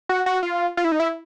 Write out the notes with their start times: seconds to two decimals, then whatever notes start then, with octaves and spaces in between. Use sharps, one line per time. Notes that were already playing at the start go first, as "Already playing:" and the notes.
0.09 F#4
0.26 F#4
0.43 F4
0.77 F4
0.84 E4
0.92 D#4
1.00 E4